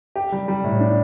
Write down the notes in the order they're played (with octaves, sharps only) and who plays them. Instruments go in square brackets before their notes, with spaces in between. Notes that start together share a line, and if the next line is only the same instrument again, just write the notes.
[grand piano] G4
G3
G3
A2
D4